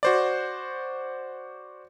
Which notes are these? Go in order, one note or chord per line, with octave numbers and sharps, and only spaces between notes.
F#4 C5 D5